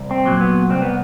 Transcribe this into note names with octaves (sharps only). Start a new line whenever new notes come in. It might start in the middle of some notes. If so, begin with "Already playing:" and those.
Already playing: C2
C4
A#2 F#3
B3
C2 C4
B3